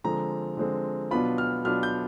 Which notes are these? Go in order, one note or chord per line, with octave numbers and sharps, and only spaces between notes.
D3 F3 G#3 C4 A#5
D3 F3 G#3 C4
B2 F#3 B3 D4 F4 B5
F6
B2 F#3 B3 D4 F4 F6
G6